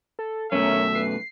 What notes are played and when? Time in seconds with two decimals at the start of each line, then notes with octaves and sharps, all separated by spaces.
0.19 A4
0.52 F#2 B2 A3 C#4 A#4 E5
0.95 B4 C7